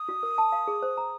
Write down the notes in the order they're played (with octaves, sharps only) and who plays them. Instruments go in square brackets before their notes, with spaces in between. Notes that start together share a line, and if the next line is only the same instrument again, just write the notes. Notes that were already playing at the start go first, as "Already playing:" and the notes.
Already playing: [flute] D#6
[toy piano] F#4
A#4
A5
F5
G#4
C5
A#5